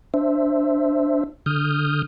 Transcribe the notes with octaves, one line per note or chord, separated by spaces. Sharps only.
D4 C5 E5
D3 D#6 F6 G6